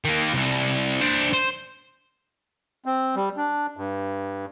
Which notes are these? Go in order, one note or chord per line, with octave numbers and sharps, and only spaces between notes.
D#3 A#3
C2
D4 C5
C5
C4
G3
D4
G2